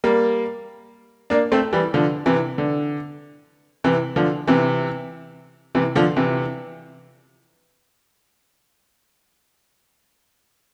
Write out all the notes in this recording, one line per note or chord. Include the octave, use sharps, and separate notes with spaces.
G3 A#3
A#3 D4
A3 C4
E3 G3
D3 F3
C3 E3
D3
C3 E3
D3 F3
C3 E3
C3 E3
D3 F3
C3 E3